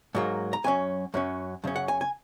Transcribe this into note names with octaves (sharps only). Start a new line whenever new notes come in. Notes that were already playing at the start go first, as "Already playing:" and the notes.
G#2 F#3 A#3
A#5
F#2 F#3 C#4 G#5
F#2 F#3 C#4
F#2 C#3 C#4
F#5
G#5
G#5